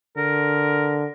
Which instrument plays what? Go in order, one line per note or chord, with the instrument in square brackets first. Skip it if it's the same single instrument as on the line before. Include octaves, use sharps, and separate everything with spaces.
[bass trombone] D3 [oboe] A#4